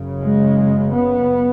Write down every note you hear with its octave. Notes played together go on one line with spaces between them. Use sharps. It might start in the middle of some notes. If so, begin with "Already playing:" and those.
Already playing: F#1 F#2 C#3
G#3
B3